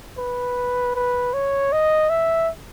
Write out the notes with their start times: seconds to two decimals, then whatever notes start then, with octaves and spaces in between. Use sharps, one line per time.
0.18 B4
0.95 B4
1.34 C#5
1.72 D#5
2.10 E5